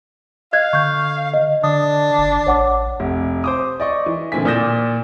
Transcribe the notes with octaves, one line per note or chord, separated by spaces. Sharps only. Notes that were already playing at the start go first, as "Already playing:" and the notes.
D#5 F5 F#6 G#6
D3 C#6 G6
D#5
D3 D4 D#6
F#1
A1 C#5 F#5 D6
F1
C5 D6 D#6
D5 D#5 C#6
E3
A#2 D3 E3 C4 G#5 B6
A#2 D5 D#6 G6 A#6 E7